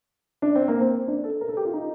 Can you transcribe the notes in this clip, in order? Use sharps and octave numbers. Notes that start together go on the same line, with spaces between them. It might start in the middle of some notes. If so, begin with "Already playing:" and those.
D4
C4
A#3
C4
D4
A4
A#4
A4
G4
F4
D#4